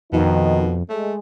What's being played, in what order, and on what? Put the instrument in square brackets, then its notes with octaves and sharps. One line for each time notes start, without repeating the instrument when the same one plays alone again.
[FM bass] F2 [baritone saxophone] B2 [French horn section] D#3 D#4
[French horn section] G#3 [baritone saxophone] A3